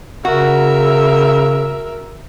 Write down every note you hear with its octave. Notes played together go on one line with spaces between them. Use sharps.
C#3 F#4 A#4 E5